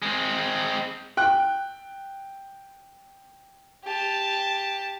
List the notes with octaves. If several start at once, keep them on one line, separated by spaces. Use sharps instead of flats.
G#3 C4
G5 F#6
G4 A5